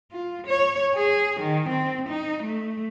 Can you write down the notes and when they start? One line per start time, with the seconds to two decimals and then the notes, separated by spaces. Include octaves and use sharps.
0.12 F4
0.47 C#5
0.95 G#4
1.40 D#3
1.69 C4
2.08 D#4
2.43 A3